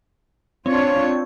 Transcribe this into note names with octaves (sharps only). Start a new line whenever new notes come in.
C4 D4 F4 C#5